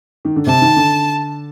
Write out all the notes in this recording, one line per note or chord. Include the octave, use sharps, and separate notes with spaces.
D#3
D3
C3 A5
D#3
D3